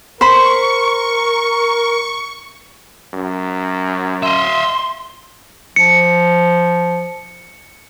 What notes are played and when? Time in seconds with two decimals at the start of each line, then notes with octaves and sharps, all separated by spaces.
0.21 A#4 C5 B5 C#6
3.14 F#2
4.23 D#5 E5 C6
5.76 F3 C#7